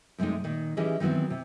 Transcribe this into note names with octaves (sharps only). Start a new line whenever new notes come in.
F#2 C3 G#3 A3 D#4
A#2 D#3
E3 C#4 E4 G4 G#4 D#5
D#3 E3 F#3 B3 C4
C3